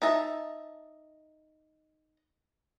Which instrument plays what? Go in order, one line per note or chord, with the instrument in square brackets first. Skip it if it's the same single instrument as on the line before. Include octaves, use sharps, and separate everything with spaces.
[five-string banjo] D#4 E5 A5